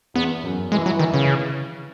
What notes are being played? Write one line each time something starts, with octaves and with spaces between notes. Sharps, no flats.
E2 B3
F#2
E3 G#3
F#3
D#3
C#3